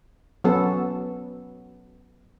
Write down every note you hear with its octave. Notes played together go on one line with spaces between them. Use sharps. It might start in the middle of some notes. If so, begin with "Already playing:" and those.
F#3 B3 C#4 A4